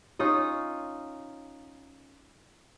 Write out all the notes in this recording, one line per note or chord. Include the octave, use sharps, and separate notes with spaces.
C#4 D#4 F4 D#5